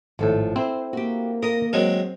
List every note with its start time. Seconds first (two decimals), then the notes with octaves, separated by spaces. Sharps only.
0.19 G#1 A2 F3 A4
0.56 C4 E4 C5
0.93 A#3 F#4 G4
1.43 A#4 D#5
1.73 D#3 F#3 G#3 C4